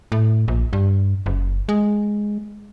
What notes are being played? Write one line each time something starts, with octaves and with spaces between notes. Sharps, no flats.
A2
A#1
G2
F#1
G#3